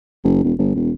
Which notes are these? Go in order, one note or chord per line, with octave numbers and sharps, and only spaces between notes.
F#1
E1
G1
E1